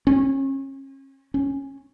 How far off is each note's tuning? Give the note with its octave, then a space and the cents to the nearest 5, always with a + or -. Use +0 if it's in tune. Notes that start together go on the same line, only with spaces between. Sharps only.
C#4 -35
C#4 -10